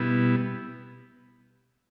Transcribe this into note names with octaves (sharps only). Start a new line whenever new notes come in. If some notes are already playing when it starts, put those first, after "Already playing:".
Already playing: B2 G3 B3 E4